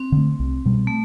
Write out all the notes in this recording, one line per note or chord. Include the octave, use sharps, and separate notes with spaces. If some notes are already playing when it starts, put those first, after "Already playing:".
Already playing: C4
D3 A3
C2
B2 G3
A3